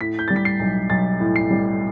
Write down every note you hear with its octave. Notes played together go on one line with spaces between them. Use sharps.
A2 B6
G6
G3 A6
B6
C7
B1
B1 A6
A2
C7
G3